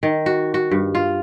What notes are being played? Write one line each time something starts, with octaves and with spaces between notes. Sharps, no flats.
D#3
F#4
F#4
G2
F4